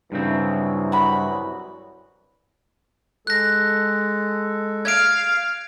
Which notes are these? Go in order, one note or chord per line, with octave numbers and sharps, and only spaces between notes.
C2 G2 C#3 E3 F#3 C4
F#4 B5
G#3 A4 F#6 A#6
F5 G#6 D7